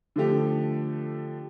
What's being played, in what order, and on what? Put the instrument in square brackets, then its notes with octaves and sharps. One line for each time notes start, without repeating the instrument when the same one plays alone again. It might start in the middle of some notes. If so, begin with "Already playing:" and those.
[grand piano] D3 F3 A3 G4